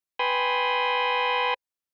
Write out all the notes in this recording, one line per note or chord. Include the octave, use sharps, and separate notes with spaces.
B4 G5 G#5 B5 C6 D#6